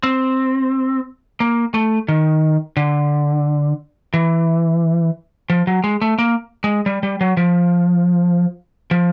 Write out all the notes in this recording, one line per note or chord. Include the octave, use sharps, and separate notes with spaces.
C4
A#3
A3
D#3
D3
E3
F3
F#3
G#3
A3
A#3
G#3
G3
G3
F#3
F3
F3